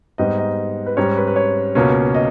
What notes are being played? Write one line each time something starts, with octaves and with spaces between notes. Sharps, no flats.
G#2 G3 B3 D#4 D#5
D#5
B4
G#2 G3 C#4 C#5
B4
B4
C#5
C#2 B2 A#3 C#4
D#5